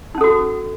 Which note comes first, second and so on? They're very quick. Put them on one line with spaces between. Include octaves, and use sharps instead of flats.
D#4 C#4 A4 F#4